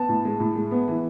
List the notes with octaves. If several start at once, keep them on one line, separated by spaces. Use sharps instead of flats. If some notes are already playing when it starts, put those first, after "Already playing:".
Already playing: B3 A5
A2
G#3
A2
G#3
B3
E3